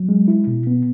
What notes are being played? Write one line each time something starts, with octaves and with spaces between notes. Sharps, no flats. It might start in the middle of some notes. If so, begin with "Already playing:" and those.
Already playing: F#3
G#3
E4
B2
B3